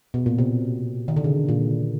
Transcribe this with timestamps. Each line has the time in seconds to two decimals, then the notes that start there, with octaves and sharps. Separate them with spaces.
0.14 B2
0.26 A#2
0.38 C3
1.08 D#3
1.16 D3
1.24 C#3
1.49 A#2